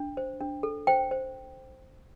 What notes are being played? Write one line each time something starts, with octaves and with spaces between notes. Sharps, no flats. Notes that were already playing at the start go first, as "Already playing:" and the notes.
Already playing: D4
C5
D4
A4
C5 G5
C5